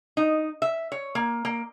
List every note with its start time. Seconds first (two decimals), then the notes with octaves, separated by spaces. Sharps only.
0.17 D#4
0.62 E5
0.92 C#5
1.15 A#3
1.45 A#3